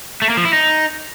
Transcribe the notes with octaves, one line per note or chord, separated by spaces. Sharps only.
A3
A#3
F3
E4
D#4